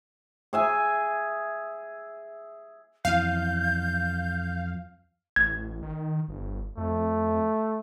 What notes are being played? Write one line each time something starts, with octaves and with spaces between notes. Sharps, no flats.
G#4 E5 G#5
F2 E3 F5 G6
A1 G#6
D#3
G1
F2 A3